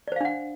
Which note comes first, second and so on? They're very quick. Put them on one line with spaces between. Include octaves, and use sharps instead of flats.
D5 C5 F5 D4 F#5